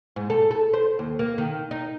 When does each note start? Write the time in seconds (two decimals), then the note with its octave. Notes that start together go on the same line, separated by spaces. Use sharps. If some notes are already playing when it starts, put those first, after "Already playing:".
0.16 G#2
0.30 A4
0.51 A4
0.73 C5
0.99 D#2
1.19 A#3
1.38 D#3
1.71 D#4